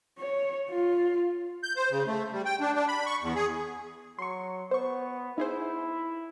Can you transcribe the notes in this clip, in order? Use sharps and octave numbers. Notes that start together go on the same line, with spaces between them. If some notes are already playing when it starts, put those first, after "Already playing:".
C#5
F4
G6
C5
C#3
A3
G3
G5
D4
D4
B5
C#6
E2
G#4
F#3 C6 C#6
B3 C5 C#6
D#4 E4 G#4 C5